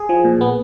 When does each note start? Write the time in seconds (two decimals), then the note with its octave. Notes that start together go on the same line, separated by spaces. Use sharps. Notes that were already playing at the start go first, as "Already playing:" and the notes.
Already playing: G#4
0.09 F3
0.24 A#2
0.41 B3